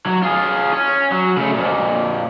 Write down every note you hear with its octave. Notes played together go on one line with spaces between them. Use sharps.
F#3
F4 G#4
C#4
F#3
C#3 A3
F2 A#2